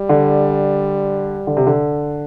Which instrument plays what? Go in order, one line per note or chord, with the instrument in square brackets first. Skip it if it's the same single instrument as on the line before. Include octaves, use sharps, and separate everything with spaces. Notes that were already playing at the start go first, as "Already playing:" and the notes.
Already playing: [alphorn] G3
[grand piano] D3
D3
C3
D3